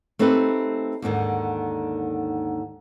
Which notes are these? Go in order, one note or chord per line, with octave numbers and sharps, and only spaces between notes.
A3 C4 D#4 G4 B4
D#2 G#2 D3 D#3